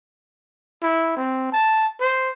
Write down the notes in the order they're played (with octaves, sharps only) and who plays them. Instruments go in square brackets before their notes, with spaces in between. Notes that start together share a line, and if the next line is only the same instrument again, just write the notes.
[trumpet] E4
C4
A5
C5